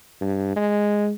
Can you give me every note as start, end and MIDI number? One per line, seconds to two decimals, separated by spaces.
0.21 0.53 43
0.56 1.12 56